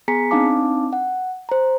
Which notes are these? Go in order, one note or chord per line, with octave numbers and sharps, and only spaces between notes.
B3 G#4 G#5 A#5 B6 C#7
C4 D4 D#4 F5 A5 D6
F#5
C5 A#5